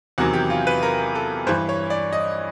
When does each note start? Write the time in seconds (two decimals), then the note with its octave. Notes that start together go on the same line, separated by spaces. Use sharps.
0.18 E2 C3 D#3 F#3 F#4
0.33 G4
0.50 F4
0.67 B4
0.83 A#4
1.15 A4
1.47 G2 E3 C5
1.69 C#5
1.90 D5
2.12 D#5